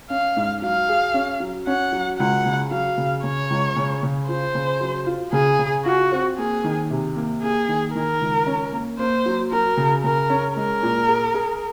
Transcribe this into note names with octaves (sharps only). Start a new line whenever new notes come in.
C#4 F5
G#2
F#3 F5
G#4
C#4
F#3
C#4 F#5
F#3
C#2 F#5
C#3
F#3 F5
C#3
C#3 C#5
C#2
C#3
C#3
F4 C5
C#3
F#3
F4
C#3 G#4
C#3
F4 F#4
C4
A#3 G#4
D#3
C3
A#3
A#3 G#4
D#3
D#3 A#4
C#2
C#4
A#3
A#3 C5
F#3
F#3 A#4
C#3
C#3 A#4
C#4
G#3 A#4
A#2
G#4
G#4